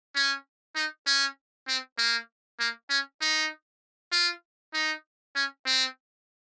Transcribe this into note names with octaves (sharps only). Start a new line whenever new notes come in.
C#4
D#4
C#4
C4
A#3
A#3
C#4
D#4
F4
D#4
C#4
C4